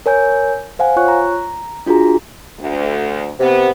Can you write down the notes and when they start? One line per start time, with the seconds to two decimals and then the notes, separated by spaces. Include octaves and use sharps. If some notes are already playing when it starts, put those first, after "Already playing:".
0.06 A#4 C#5 G#5 G6
0.79 C5 F5 F#5 G#5
0.96 F4 C#5 C#6 F#6
1.08 A#5
1.86 D4 F4 F#4 G#4 A#5
2.59 D2
3.40 C3 B3